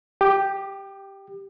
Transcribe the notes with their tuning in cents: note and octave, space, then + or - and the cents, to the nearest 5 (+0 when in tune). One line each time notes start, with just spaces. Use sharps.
G4 +0 D6 +35